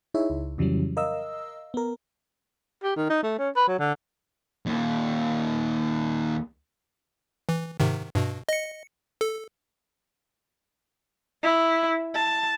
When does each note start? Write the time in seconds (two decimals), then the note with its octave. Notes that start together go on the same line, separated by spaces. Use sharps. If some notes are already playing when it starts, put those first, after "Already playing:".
0.14 D#4 E4 G#4 C#5 E5
0.30 C#2
0.58 F2 C#3 E3 F#3 G3 C#4
0.97 A#4 D#5 F5 E6
1.74 B3 A#4
2.83 G4
2.96 D#3
3.10 D#4
3.23 A3
3.38 C#4
3.56 B4
3.68 F#3
3.79 D3
4.66 D#2 A#2
7.49 E3
7.80 G#2 C3 D#3
8.15 G2 B2
8.49 D#5 C#7
9.21 A4
11.43 E4
12.15 A5